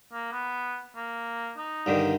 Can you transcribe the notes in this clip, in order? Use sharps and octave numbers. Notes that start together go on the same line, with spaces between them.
A#3
B3
A#3
D#4
G2 D3 D#3